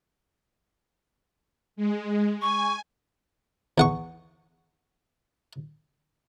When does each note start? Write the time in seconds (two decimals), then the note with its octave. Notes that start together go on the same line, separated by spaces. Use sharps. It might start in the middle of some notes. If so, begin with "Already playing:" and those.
1.76 G#3
2.42 G#5 C#6
3.78 E2 F#5 C#6